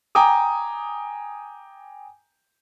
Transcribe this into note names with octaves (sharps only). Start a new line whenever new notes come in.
G5 G#5 A#5 D6 D#6